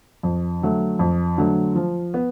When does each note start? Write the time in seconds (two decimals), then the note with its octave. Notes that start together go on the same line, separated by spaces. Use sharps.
0.23 F2
0.62 D3 F#3 A3
0.99 F2
1.38 D3 F#3 A3
1.75 F3
2.14 B3